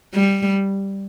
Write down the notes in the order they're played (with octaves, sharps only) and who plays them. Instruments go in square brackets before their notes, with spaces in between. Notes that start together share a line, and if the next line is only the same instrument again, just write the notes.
[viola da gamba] G3